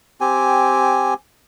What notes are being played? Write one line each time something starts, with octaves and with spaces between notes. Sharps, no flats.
C4 G4 G#5